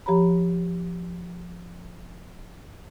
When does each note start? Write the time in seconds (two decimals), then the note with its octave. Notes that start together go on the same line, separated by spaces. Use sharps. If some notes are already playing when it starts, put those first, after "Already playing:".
0.06 F3 G4 C#5 A#5 B5